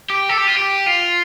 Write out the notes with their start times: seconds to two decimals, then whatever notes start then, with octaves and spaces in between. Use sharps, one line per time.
0.10 G4
0.29 A4
0.38 G4
0.47 F4
0.57 G4
0.86 F4